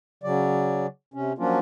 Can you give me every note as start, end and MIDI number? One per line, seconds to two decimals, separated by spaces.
0.24 0.87 49
0.24 0.87 54
0.24 0.87 74
1.14 1.33 48
1.14 1.33 61
1.38 1.60 53
1.38 1.60 54
1.38 1.60 58
1.38 1.60 61
1.38 1.60 62
1.38 1.60 65